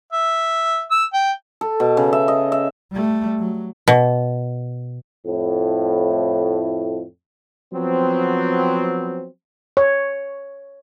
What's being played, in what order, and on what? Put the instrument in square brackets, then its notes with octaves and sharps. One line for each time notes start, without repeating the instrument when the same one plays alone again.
[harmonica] E5
E6
G5
[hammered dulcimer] A4
B2
C#3
E5
D#5
E5
[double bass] G3 A3
F#3
[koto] B2
[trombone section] F2 A2
[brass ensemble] F3 F#3 B3 C4
[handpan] C#5